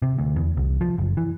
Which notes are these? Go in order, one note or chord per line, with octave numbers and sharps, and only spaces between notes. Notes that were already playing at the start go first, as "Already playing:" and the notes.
C3
D2
E2
C2
F3
F#1
E3